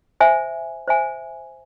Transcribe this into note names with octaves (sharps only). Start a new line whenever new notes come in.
C5 E5 G#5
C5 E5 G#5